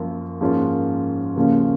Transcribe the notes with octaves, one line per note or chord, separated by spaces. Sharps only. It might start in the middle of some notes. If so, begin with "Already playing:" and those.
Already playing: F#2 F3 A#3 F4 A#4
G#2 F3 A#3 C#4 F4
D#2 C#3 F3 A#3 C#4